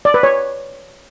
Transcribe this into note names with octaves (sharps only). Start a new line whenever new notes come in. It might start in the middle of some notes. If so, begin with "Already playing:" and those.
D5
B4
C#5